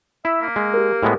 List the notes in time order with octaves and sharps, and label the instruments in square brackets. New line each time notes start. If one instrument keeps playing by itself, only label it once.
[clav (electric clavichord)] E4 [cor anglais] E5
[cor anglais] A#3 [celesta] B6
[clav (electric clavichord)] G#3
[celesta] G4 A#4
[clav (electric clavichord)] A2 G#3 B3